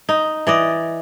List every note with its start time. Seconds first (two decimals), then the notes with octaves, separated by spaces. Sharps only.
0.09 D#4
0.47 E3 D5 D#5